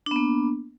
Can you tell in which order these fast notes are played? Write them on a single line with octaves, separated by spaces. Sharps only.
D4 B3 A#3